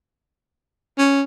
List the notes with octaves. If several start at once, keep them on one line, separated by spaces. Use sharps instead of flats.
C#4